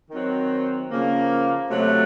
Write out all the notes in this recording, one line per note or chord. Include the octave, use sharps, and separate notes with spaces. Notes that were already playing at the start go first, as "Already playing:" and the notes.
D#3 F#3 C4
C#3 F3 A#3
C3 F#3 A3